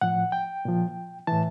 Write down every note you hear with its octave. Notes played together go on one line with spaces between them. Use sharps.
A2 F3 F#5
G5
A#2 F3
A2 E3 A5